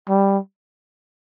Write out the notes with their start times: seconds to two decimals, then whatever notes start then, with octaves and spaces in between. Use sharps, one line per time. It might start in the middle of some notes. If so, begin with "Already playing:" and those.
0.09 G3